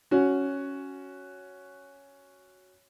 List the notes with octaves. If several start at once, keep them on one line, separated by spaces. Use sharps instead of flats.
C#4 F#4